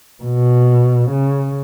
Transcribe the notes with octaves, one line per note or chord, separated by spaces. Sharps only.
B2
C#3